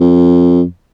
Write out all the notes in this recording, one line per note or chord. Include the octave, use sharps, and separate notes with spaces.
F2